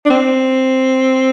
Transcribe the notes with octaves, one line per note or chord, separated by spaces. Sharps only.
D4
C4